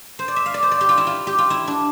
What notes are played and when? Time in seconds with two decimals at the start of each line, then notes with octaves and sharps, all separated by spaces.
0.19 C5
0.28 D5
0.36 E5
0.46 F5
0.54 D5
0.63 C5
0.72 D5
0.81 G4
0.89 F4
0.98 E4
1.07 F4
1.27 G4
1.38 F4
1.50 E4
1.67 D4